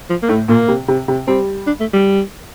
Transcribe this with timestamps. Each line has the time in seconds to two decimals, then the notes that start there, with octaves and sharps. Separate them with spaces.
0.10 F3
0.23 A#3
0.29 A2 A3
0.48 A#2 A#3
0.68 C3
0.88 C3
1.08 C3
1.27 G3 C4
1.67 D4
1.80 A3
1.93 G3